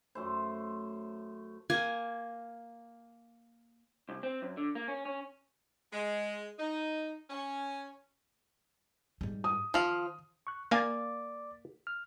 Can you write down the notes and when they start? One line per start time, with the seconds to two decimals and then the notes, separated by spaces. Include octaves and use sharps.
0.15 F#2 A3 C5
1.70 A#3 G#5
4.09 C2
4.23 C4
4.42 F#2
4.57 D3
4.75 A#3
4.88 C#4
5.05 C#4
5.93 G#3
6.59 D#4
7.30 C#4
9.21 G#2 G3
9.44 D#6
9.74 D#3 F3 F5
10.47 C#6 F#6
10.71 A#3 D5 F5 G#5 D6 A6
11.87 F6